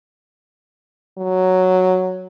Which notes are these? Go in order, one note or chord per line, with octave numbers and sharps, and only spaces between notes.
F#3